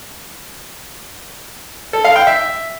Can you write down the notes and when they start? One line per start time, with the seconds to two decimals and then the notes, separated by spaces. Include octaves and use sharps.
1.93 A4
2.05 F5
2.16 G5
2.27 E5